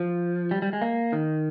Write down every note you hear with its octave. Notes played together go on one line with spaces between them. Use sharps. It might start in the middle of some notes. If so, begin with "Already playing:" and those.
Already playing: F3
G3
G3
G#3
A#3
D#3